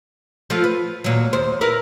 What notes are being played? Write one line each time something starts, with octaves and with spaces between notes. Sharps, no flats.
F3 A3 F4
B4
D#2 A#2 F#3
D#2 C5
E4 A#4 B4